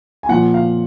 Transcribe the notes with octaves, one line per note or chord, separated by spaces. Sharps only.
G#5
A#2 F3 F#5
F5